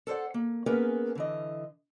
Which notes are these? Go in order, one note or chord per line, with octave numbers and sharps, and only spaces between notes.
A4 A#4 C5 D5 F#5
A#3
A#3 B3 C#4 G#4 A#4 B4
D3 E3 D#5